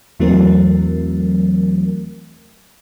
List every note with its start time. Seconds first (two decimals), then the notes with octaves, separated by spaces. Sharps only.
0.20 E2 E3 F#3 A3 C4 A#4